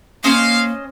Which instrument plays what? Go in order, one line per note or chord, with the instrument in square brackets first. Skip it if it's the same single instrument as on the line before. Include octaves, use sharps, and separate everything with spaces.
[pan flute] A#3 [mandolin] C#4 C5 D#5 [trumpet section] F5